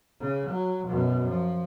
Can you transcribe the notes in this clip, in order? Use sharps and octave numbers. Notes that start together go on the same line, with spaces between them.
C#3
F#3
F#2 B2
F3